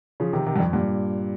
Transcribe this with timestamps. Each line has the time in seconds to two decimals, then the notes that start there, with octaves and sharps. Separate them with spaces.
0.20 C#3 F3
0.33 C3 D#3
0.46 C3 D#3
0.56 G2
0.60 F2
0.73 G2 A#2